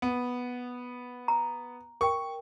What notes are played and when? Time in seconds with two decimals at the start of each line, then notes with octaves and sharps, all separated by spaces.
0.02 B3
1.28 A#5
2.01 A#4 G5 C#6